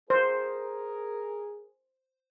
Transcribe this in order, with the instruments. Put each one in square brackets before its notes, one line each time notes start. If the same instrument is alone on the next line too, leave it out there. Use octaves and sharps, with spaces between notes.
[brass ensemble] G#4 A#4 [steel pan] C5